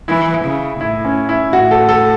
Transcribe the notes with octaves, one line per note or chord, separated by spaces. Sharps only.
E3 E4
C#3
A2 E4
C#4
E4
A2 F#4
A4
A4